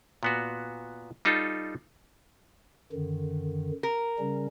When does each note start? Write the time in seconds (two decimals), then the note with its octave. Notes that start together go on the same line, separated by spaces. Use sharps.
0.23 A#2 B3 F#4
1.25 G3 D#4 F4 A4
2.92 F#2 D3 D#3
3.83 A#4
4.19 C#3 G3 C#4